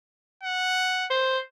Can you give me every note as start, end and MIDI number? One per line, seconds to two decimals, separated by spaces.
0.43 1.07 78
1.10 1.38 72